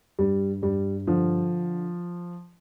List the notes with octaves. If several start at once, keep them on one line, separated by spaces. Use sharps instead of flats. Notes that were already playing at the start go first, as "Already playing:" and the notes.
G2 G3
G2 G3
D3 F3